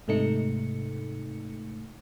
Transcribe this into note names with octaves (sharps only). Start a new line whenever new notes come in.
G#2 C3 A3 D#4 C#7